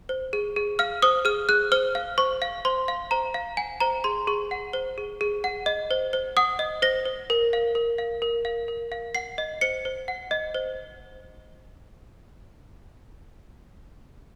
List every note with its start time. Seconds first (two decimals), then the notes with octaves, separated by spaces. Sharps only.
0.09 C5
0.33 G#4
0.56 G#4
0.79 F5 F6
1.02 C5 D#6
1.25 G#4 F6
1.49 G#4 F#6
1.72 C5 F6
1.95 F5
2.18 C5 C#6
2.42 F5
2.65 C5 C6
2.88 F5
3.11 C5 A#5
3.34 F5
3.57 F#5 G#5
3.80 C5 A#5
4.04 G#4 C6
4.27 G#4 C#6
4.51 F#5
4.73 C5
4.98 G#4
5.21 G#4
5.44 F#5
5.66 D#5
5.91 C5
6.13 C5
6.37 F#5 D#6
6.59 D#5
6.82 C5 A#6
7.05 C5
7.30 A#4
7.53 F5
7.75 A#4
7.98 F5
8.22 A#4
8.45 F5
8.68 A#4
8.92 F5
9.15 F#5 C7
9.38 D#5
9.61 C5 C#7
9.85 C5
10.08 F#5
10.31 D#5
10.54 C5